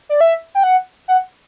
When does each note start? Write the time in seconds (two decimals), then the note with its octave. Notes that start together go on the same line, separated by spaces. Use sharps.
0.09 D5
0.21 E5
0.55 G5
0.64 F#5
1.08 F#5